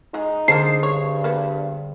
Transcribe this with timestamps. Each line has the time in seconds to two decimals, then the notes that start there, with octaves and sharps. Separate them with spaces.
0.14 G#3 D#4 G#4
0.48 D3 A#3 D4 G#4 C5 A5 C7
0.83 G2 C#5
1.24 A#3 B3